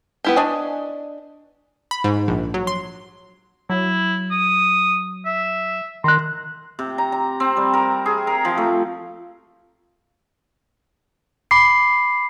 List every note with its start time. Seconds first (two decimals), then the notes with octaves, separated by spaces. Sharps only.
0.24 B3 E4 G4
0.36 D4 D#5 G#5 C#6
1.91 B5
2.04 G#2
2.28 A#1
2.54 F#3
2.67 C6
3.70 F#3 E4
4.31 D#6
5.25 E5
6.04 D#3 A#5 C6 F#6
6.79 C3
6.98 A#5
7.12 A#5
7.40 C4
7.57 G3
7.74 A#4
8.06 G#4
8.27 A#4
8.45 F3
8.58 A3
11.51 B5 D6 C7